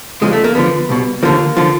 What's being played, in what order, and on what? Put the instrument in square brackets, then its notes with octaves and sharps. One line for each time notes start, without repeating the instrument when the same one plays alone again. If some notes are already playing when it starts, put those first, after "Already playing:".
[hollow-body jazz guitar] E2 C#3 F3 G#3
A3
A#3
F2 D3 F3 B3
C2 B2
D#2 D3 F3 A#3
D3 F3